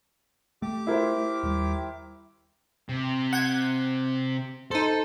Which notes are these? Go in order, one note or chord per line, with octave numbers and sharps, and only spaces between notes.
A3 G4 D6
E4 A#4 C5
D#2 G3
C3
F#5 G6 G#6
D#4 A4 C5